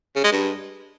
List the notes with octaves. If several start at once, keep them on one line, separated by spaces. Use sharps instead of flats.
C#3
G#3
G2